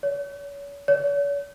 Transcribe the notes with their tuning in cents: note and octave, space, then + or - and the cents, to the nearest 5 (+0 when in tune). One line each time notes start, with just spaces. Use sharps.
C#5 +40
C#5 +45